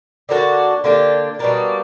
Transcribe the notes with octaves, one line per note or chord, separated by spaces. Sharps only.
D3 A#3 D4 F#4
D3 A#3 D4 G4
B2 G3 A#3 D4